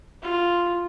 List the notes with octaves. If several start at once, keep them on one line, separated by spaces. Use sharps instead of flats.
F4